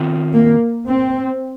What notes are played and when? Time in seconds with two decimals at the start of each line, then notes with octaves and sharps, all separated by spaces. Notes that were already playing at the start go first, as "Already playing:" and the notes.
Already playing: D#3 C4 F4
0.34 A#3
0.87 C4